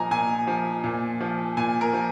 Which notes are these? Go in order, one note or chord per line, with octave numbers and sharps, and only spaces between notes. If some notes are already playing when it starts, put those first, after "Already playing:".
Already playing: A#2 F3 D#5 G#5 A#5
A#2 G#5
F3
A#2
F3
A#2 G#5
A#4
F3